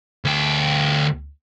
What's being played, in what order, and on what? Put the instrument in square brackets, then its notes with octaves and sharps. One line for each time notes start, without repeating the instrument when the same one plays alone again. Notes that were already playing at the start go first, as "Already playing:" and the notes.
[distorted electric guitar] D2 G5